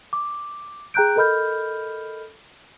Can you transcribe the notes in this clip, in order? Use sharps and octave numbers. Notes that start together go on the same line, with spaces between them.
D6
G#4 G5 A#5 F#6 G6 D7
A4 A#4 D#5 B5 F6 G6